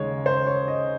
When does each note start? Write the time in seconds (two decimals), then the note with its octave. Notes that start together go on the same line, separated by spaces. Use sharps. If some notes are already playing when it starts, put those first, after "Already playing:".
Already playing: D#2 C#3 G#3 C#4 C#5
0.26 C5
0.47 C#5
0.68 D#5